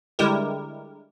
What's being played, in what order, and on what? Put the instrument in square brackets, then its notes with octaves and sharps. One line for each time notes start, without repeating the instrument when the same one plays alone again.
[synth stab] D3 G3 G#3 E4 G4 A#4